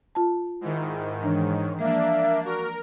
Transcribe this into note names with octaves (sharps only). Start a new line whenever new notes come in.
F4 A5
G#2 D#3 E4
E3 D4 C#5
F3 G#3 A#3 D4 E5
F#4 A#4